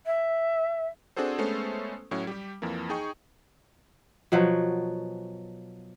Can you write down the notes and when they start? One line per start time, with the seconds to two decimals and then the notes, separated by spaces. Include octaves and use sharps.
0.06 E5
1.16 C4 D4 F#4 G#4 A4 C5
1.38 G#3 A3 B3 C#4 A4 C5
2.11 A2 F#3 C#4 E4
2.27 G3 G4
2.62 F2 E3 F3 A#3
2.89 D#4 G#4 G5 C#6
4.32 B2 F3 F#3